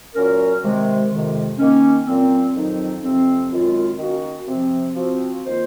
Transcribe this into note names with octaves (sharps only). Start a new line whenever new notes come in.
A#2 F#3 C#4 F#4 A#4
C3 D#3 G#3
F2 C3 D#3 G#3
D#3 A#3 C#4
A#2 F#3 C4
F2 D#3 F#3 C4 D#4
F2 C3 F3 C4
F#2 D#3 G#3 C4 F4
D#3 A#3 C#4 F#4
C3 F3 C4
F3 C4 F#4
D#3 A#3 F4 C5